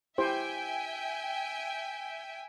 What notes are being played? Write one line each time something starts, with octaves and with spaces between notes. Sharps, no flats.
E4 G4 C5 E5 G5 G#5